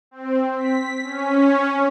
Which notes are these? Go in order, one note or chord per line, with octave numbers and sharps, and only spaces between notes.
C4
B6
C#4